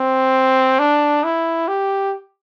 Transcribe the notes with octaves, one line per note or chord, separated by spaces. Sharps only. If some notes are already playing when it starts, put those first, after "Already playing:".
Already playing: C4
D4
E4
G4